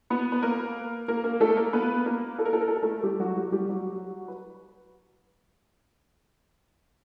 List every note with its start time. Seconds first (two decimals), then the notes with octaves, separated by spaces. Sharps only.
0.10 B3 B4
0.32 B4
0.42 A#3 A#4
1.08 A#3 A#4
1.24 A#3 A#4
1.40 A3 A4
1.57 A#3 A#4
1.73 B3 B4
2.06 A#3 A#4
2.39 A4
2.45 A#4
2.53 A4
2.61 A#4
2.68 A4
2.76 A#4
2.83 A3 A4
3.03 G3 G4
3.20 F#3 F#4
3.36 G3 G4
3.52 G3 G4
3.69 F#3 F#4
4.28 B4